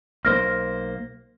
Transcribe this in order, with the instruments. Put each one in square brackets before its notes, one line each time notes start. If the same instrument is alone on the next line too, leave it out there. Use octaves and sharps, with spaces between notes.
[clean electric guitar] B1 A#3 C5 [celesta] F6 A#6